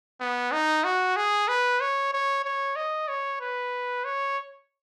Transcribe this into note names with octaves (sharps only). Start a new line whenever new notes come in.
B3
D#4
F#4
G#4
B4
C#5
C#5
C#5
D#5
C#5
B4
C#5